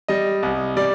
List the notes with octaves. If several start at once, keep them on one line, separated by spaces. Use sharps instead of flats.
G3 D#5
C2
G3 D5